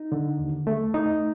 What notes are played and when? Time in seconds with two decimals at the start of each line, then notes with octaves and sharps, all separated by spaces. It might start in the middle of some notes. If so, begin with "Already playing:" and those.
Already playing: D#4
0.12 D3
0.39 D#2
0.67 A3
0.94 D#4